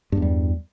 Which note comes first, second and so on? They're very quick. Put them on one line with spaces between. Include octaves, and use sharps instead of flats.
G2 E2 G3